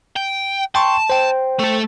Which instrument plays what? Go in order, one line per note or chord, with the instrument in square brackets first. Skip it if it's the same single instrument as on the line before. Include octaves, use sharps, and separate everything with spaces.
[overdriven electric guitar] G5
[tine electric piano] G5 C6 C#6 [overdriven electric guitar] A5
[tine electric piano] C5 G5
[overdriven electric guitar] A3 A4